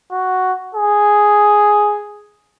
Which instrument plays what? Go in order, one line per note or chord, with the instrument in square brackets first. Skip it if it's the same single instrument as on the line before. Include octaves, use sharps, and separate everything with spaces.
[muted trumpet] F#4
G#4